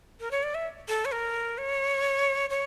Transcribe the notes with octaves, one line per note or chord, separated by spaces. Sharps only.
A#4
C#5
D5
E5
A4
C#5
A#4
C#5
C#5